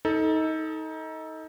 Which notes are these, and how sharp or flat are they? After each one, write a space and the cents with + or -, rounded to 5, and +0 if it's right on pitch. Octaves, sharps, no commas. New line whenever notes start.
D#4 +25 A4 +0